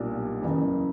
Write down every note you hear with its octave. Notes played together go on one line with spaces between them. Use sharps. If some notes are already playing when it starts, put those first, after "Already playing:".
Already playing: B1 A#2 G3 B3 D4
F#1 E2 C#3